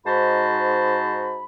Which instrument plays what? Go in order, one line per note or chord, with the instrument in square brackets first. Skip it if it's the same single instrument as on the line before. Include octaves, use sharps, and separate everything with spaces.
[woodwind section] G#2 D#4 F#4 C5 A5 B5